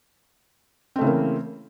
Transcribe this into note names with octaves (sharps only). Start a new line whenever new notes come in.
C#3 E3 A3 A#3 C4